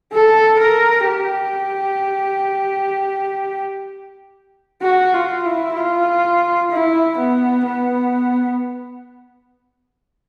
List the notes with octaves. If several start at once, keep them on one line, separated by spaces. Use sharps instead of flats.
A4
A#4
G4
F#4
F4
E4
F4
E4
B3
B3